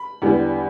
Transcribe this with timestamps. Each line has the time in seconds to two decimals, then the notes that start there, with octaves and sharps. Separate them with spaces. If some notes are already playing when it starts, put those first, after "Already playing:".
Already playing: B5
0.22 E2 D3 G3 B3